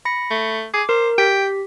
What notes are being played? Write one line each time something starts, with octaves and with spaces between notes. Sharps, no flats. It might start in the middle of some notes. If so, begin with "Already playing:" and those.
B5 A#6 C#7
A3
G#4 D6
A#4 C5
G4 G5 B6